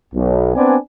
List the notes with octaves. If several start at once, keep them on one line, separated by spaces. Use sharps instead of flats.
B1
B3 C4 D4 B4 D5 G#5